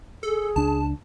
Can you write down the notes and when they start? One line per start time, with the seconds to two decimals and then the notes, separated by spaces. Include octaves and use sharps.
0.23 G#4 A4
0.56 C#2 D4 A5